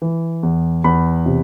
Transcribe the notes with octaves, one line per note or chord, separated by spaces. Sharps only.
E3
E2
E2 B5
C3